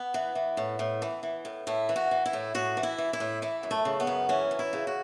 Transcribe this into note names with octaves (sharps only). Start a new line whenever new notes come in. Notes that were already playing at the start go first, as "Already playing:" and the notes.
Already playing: B3
E3
E3
A2
A2
E3
E3
A2
A2 E4
E3
F#4
E3
E4
A2
A2 F#4
E3
E4
E3
E4
A2
E3 E4
F#2
A3
C#3
B3
F#2
E3 C#4
F#2
E4
C#3
F#4